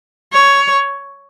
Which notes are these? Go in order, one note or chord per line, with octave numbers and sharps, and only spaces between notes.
C#5